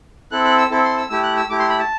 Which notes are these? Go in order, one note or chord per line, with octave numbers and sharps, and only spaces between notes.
C4 E4 A4 F#6
F#6
E6
C4 E4 A4
C6
E6
A3 E4 G4 E6
F#6
E6
A3 E4 G4 D6
C6
B5
A5